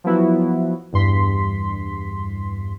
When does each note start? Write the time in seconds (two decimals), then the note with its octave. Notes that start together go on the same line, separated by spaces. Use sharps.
0.04 F3 F#3 B3 E4 F#4
0.93 E2 G2 C6 B6